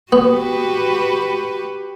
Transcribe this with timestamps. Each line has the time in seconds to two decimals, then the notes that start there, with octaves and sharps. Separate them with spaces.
0.12 B3 F#4 G4 B4